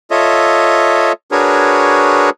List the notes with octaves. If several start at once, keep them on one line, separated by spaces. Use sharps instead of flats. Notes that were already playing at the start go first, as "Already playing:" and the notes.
F4 A4 C#5 D#5 E5
D4 F#4 G#4 A#4 B4 C#5